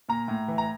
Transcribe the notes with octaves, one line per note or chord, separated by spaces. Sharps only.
A#2 A#5
A2
E3
A#5